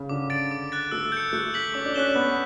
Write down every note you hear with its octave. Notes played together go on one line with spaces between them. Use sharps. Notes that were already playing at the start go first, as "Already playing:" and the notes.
Already playing: C#3
D3 D6
A6 D7
D6
F#6 A6
A3 E6
G6 C#7
A3 F#6
B6 F#7
C#4 D6
D4
C#4 F#6 B6 E7 G7
B3 F#6